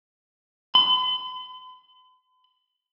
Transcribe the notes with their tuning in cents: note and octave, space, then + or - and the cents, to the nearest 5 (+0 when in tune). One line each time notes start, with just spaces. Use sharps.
B5 +45